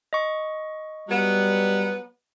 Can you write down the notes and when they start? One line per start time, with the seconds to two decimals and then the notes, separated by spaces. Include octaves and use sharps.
0.13 D#5 C#6
1.09 F#3 G3 B3